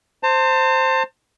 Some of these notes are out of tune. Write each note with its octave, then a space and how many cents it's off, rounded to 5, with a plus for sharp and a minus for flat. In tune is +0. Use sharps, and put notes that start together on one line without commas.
C5 +0 A5 +40